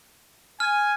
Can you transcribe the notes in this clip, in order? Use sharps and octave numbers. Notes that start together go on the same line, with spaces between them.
G#5 F6